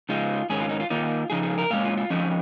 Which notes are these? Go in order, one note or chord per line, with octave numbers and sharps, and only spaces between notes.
C#3 G#3 D#4 F4
G#2 D#3 C#4 G#4
F4
D#4
F4
D#3 A#3 D#4 F4
C#3 F3 D#4 G#4
G#4
A#4
A#2 G#3 C#4 F5
F4
F4
F2 F3 C#4 D#4